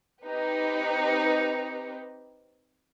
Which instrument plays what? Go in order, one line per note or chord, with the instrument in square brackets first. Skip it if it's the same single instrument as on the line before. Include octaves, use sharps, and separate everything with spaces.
[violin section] C4 D#4 G4 B4